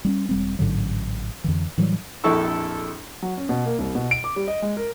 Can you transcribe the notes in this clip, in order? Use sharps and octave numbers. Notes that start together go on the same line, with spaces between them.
G3 B3 C#4
E1 G3 C4
A1 G#2 D3 F#3
F2 D3 E3
A2 E3 F#3 G3
A#1 F2 E4 A4 C#6 E6
F#3
C#4
B2
A#3
C2
B2
D7
D6
G3
D#5
G#3
A#4